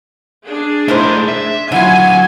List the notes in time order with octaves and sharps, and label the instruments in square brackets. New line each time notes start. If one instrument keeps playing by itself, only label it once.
[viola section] D4 G#4
[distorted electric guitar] A3 D#4 [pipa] E4 A#4 C5
[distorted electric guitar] E5
[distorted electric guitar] D3 F#3 [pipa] E4 F4 [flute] F#5 [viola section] G#5